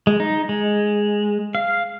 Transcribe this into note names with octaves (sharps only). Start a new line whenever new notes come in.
G#3
D#4
G#3
F5